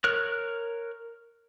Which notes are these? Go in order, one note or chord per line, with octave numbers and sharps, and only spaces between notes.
A#4 C#5 F6 F#6